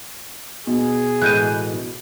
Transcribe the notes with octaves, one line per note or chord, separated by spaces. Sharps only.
B2 G#4
A2 E3 G#3 F#6 G6 D#7